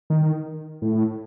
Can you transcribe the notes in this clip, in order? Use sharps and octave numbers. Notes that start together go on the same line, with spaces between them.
D#3
A2